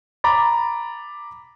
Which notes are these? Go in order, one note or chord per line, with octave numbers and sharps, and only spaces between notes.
A#5 B5 D6 A6